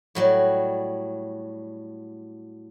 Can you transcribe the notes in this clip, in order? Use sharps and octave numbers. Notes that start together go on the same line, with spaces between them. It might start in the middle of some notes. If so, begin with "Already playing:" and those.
A2 F#3 G3